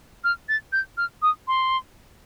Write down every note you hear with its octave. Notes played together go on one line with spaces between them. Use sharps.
F6
A6
G6
F6
D#6
C6